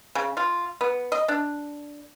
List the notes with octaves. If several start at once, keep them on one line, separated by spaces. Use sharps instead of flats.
C#3
F4
B3
D#5
D4